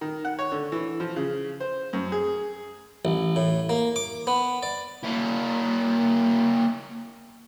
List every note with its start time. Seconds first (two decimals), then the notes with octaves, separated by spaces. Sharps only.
0.01 D#3
0.25 F#5
0.39 C#5
0.52 D3
0.72 E3
1.00 F3
1.16 C#3
1.60 C5
1.93 F#2
2.12 G#4
3.05 A1
3.36 A2
3.69 A#3
3.96 D6
4.27 B3
4.63 D5
5.04 A#3 E4